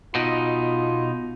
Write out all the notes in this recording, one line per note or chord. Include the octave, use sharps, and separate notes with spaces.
B2 D#4 F4